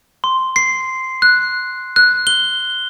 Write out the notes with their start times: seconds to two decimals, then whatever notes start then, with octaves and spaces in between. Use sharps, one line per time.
0.24 C6
0.56 C7
1.22 F#6
1.96 F#6
2.27 G7